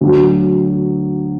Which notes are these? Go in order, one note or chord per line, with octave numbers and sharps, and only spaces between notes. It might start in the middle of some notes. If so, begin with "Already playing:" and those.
D2 D3 F#3